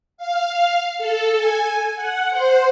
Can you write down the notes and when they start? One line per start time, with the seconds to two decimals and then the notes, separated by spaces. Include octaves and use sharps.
0.17 F5
0.98 A4
1.37 G#5
1.96 F#5
2.31 C5